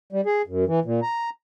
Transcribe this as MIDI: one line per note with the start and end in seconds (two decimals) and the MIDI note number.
0.12 0.21 55
0.26 0.42 68
0.47 0.65 42
0.67 0.80 52
0.85 1.00 46
1.02 1.30 82